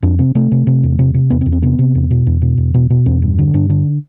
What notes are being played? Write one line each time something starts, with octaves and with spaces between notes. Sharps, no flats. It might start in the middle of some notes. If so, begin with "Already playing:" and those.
F2 D4
C3 C4
C3 A3
C3
C3
E2
C3
C3
E2 B3
C4
E2
C4
C3 B3
C3
E2
B2
E2
B2
E2
B2
B2
E2 C4
G2
D3
G2 D4
D3 D4